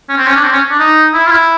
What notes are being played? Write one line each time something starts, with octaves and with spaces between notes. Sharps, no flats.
C#4
C4
C#4
D4
C4
C#4
D4
D#4
E4
F4
E4